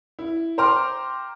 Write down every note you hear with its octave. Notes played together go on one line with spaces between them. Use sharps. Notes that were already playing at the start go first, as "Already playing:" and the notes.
E4
C5 G5 A#5 C6 D6 F6